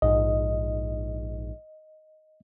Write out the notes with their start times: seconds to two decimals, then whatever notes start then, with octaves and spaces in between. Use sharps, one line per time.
0.02 A#1 G#2 D#5